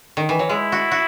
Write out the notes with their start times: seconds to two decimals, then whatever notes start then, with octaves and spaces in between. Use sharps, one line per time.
0.17 D#3
0.29 E3
0.39 F#3
0.49 G#3 E4
0.72 F#4
0.91 F#4